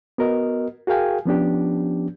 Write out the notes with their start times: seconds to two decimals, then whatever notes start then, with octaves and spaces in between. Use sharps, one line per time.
0.18 B3 F#4 A#4 D#5
0.87 F#4 G#4 A#4 F5 G5 G#5
1.26 F3 B3 C#4 D4 G4